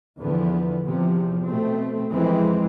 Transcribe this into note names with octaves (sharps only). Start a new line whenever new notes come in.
E2 D3 F3 B3
E2 C3 F3
B2 A3 C4
F2 E3 G#3 C4